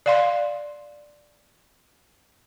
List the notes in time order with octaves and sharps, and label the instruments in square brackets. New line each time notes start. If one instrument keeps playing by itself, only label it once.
[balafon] D5 F5 C6